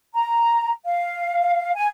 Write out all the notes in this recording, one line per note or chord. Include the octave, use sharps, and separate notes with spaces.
A#5
F5
G#5